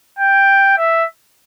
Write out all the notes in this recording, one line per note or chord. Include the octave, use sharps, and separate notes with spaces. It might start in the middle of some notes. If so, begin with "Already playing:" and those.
G5
E5